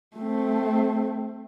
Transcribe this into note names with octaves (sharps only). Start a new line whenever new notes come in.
A3 C4